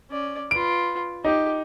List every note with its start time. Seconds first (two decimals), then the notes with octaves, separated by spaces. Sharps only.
0.10 C#4 D5
0.51 F4 B4 D7
1.24 D#4 G4